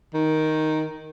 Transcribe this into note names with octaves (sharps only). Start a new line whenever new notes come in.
D#3